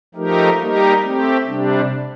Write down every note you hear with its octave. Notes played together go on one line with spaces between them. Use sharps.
F3 A3 D#4 G4 A#4
G3 A#3 D#4 G4 A#4
A3 C4 G4
C3 G3 D4